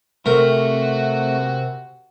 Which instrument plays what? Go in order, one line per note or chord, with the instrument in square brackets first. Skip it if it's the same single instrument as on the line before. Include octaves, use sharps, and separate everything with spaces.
[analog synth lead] C3 [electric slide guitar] A3 [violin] F#4 [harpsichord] A#4